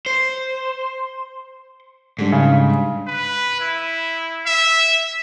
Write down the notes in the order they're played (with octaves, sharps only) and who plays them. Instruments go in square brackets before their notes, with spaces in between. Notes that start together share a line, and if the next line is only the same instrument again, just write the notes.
[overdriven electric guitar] C5
[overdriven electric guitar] G#2 [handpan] D3 G3 D4
[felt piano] C#3
[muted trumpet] B4
E4
E5